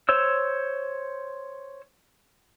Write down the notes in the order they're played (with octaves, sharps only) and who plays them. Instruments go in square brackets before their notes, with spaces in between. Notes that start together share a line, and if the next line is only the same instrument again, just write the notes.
[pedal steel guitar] C5 C#5 E6